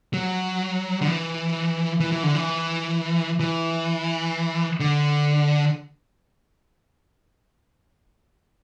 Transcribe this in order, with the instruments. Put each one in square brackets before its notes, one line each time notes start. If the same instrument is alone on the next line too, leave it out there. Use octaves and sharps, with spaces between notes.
[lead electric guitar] F#3
D3
E3
E3
E3
D3
E3
E3
D3